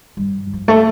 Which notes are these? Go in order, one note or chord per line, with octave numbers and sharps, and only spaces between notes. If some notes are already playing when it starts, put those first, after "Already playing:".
G2
F3
A3